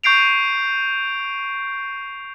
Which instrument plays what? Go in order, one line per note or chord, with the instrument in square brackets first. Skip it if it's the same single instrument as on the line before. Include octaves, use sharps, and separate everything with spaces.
[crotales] C#6 G6 C7 D7 F7